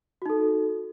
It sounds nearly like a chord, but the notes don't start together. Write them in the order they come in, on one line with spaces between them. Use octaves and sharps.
F#4 D#4 A4